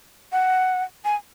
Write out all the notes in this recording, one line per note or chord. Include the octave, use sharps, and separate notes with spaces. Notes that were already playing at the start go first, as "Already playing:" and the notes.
F#5
G#5